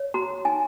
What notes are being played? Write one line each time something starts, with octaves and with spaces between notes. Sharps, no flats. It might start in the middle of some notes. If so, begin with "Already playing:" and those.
Already playing: C#5
F#4 A#5
D#4 G#5